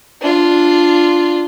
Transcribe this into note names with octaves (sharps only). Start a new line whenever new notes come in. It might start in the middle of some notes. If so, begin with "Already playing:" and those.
D4 F4